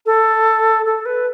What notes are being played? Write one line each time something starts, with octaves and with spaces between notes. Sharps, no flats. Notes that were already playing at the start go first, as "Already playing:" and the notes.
A4
A4
B4